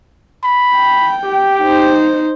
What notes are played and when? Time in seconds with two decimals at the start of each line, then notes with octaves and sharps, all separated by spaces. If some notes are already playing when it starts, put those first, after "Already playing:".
0.44 B5
0.76 G5
1.25 G4
1.61 D#4 C5